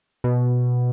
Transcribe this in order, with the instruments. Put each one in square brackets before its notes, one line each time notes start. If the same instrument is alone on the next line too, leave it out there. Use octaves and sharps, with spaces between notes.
[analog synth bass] B2